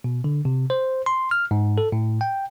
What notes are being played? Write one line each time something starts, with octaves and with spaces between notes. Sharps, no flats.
B2
D3
C3
C5
C6
F6
G#2
A4
A2
G5